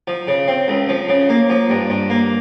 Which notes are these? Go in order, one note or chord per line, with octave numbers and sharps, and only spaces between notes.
F3
C#3
C4
C#2
F3
C#3
A#3
F3
G2
G2
A#3